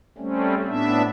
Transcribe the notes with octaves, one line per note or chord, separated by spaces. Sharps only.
G3 A3 C4 C#4
A2 B3 D4 E5